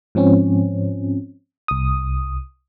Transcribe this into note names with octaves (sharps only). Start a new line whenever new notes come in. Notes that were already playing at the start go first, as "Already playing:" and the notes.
G#2 F3 C4 C#4
C2 D#6